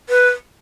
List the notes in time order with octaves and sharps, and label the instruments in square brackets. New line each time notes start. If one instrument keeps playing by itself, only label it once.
[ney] B4